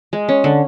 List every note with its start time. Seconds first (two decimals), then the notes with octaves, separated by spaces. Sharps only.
0.13 G#3
0.29 C#4
0.44 D3